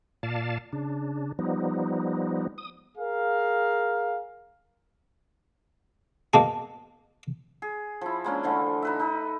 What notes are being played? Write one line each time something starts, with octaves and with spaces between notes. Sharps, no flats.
A#2 D5 F5 A5
C#3 D4
F3 G3 B3 D#4
D#6
G#4 A#4 F5
B2 A#3 G#4 A5
G#4
F3 E4
G#3 A#3 C#4 D4
D3 E3 F3 A3
D#4 B4 E5
D#4 A4